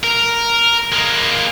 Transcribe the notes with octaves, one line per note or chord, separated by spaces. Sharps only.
A#4
G#3 A#3